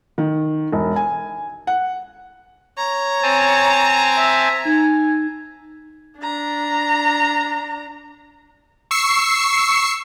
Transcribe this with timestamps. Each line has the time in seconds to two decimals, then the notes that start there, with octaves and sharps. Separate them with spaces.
0.18 D#3
0.72 E1
0.96 G#5
1.67 F#5
2.78 C#5 A#5
3.22 C4 G#5 A5
4.17 E5
4.65 D#4 G#5
6.20 D4 A#5
8.91 C#6 E6 C7 C#7